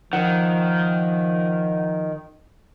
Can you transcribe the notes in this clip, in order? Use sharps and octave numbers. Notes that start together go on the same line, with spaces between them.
D#3 F3 F#5